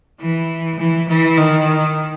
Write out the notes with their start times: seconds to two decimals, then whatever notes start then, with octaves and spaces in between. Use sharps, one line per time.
0.21 E3
0.79 E3
1.08 E3
1.37 D#3